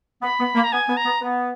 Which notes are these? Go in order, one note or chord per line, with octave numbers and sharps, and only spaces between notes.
B3 B5
B3
A#3
A#5
B3 G#5
B3
A#5
B3
B3